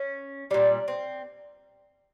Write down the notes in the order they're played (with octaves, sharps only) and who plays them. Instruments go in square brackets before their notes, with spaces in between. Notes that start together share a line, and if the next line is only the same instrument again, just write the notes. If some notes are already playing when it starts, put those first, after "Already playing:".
Already playing: [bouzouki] C#4
A#2 G3 D4
C4